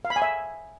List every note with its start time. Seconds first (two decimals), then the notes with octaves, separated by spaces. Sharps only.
0.05 F5
0.10 B5
0.16 G#5
0.22 E5